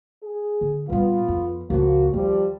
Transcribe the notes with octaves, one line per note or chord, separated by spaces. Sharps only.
G#4
D3
A#2 G3 B3 F4
F2
C#2 A#2 F3 A#3 F#4
D#2 F3 G3